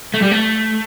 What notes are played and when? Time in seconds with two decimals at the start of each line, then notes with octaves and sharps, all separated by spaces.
0.14 A3
0.22 G3
0.31 A3